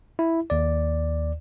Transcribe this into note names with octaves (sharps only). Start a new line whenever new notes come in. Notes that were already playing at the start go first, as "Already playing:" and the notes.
E4
D#2 D5